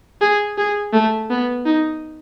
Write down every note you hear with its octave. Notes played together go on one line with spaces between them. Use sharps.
G#4
G#4
A3
B3
D#4